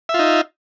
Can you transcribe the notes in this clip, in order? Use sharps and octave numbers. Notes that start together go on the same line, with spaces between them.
D#4 F4 E5